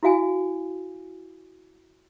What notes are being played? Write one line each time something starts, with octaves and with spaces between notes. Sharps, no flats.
E4 F#4 F5 G#5